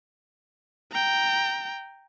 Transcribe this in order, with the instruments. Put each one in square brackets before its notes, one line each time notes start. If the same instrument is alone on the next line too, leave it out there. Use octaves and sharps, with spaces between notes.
[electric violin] G5 A#5